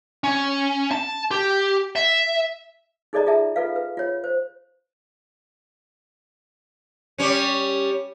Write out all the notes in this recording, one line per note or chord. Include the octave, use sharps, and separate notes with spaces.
C#4
A5
G4
E5
D#4 G#4 A4 D5 D#5 A#5
F4 G#4 E5 A5
F4 A4 B4 F5
B4
F4 C#5
C5
G3 C#4